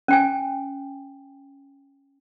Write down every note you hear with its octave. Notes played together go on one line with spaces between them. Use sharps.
C#4 G5 G#5